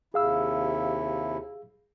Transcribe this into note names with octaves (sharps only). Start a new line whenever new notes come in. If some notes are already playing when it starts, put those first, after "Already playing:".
D#2 C3 E4 G#4 F5 E6